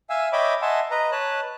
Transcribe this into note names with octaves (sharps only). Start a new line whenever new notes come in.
E5 F5 G#5 E6
C#5 D#5 E5 G5 B5 D6
D#5 E5 F#5 G#5 A5 C6
B4 D#5 A#5
B4 C#5 A5 F#6